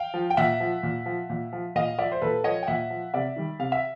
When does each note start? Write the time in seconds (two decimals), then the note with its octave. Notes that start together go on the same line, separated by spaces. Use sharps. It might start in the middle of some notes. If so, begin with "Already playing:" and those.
Already playing: F5 G5
0.14 F3
0.30 G5
0.37 A#2 E5 F#5
0.60 F3
0.83 A#2
1.06 F3
1.30 A#2
1.53 F3
1.75 A#2 D#5 F5
1.98 F3 D5 E5
2.12 C5
2.22 A#2 A4 B4
2.44 F3 C#5 D#5
2.63 G5
2.67 A#2 E5 F#5
2.90 F3
3.14 C3 D5 E5
3.36 D#3 G3
3.59 C3 F5
3.72 E5